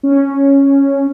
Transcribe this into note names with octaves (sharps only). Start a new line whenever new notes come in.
C#4